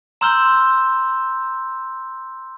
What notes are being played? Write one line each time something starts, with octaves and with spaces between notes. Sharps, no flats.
A#5 C6 E6 F6 G6 G7